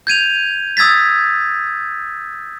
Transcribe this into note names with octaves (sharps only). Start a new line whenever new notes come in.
G6 G#6 D#7 F7
D#6 E6 G#6 A6 B6